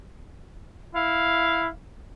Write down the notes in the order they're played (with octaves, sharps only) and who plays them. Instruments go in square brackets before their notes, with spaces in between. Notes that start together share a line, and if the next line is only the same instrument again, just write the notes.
[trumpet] E4 [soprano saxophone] F5